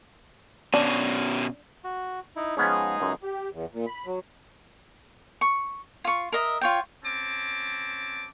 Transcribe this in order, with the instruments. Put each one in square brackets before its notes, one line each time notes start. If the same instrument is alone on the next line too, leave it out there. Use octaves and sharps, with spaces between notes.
[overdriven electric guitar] B2 C#4 [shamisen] D4
[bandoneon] F#4
D#4 E4
[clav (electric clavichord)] F3 B3 C#4 [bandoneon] G#3 D#4 G#4
[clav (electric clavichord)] C#2 F#2
[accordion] G4
E2
A#2
B5
F#3
[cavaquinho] C#6
F4 C#6
A#4 D#5 E5
F4 C#5 G5
[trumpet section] C4 C#4 A5 D6